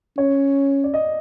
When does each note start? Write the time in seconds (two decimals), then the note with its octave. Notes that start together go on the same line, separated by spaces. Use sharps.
0.17 C#4 C#5
0.84 D5
0.94 D#5